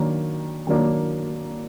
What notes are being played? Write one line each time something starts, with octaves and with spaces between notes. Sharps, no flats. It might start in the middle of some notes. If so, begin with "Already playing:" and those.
Already playing: D#3 F#3 A#3 D4
D#3 F#3 A#3 D4